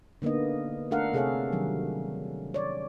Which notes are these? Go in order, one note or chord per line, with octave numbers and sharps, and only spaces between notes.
D3 A#3 B3 D#4 D#5
A3 D4 A4 A#4 F5 F#5
C3 G#4 A4 C#5 F5
D#3 F#3 G3
C#5 D5